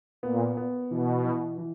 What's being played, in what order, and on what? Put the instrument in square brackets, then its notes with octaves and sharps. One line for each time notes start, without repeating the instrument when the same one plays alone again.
[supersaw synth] A#2 [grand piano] B3
[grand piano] B3
[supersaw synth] B2 [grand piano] E3
[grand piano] E3
E3